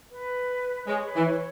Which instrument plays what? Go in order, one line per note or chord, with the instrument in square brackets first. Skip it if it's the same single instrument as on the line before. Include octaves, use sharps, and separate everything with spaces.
[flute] B4
[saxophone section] G#3 [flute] C#5
[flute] B4
[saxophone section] E3
[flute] C#5